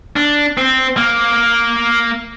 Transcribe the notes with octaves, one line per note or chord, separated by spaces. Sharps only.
D4
C4
A#3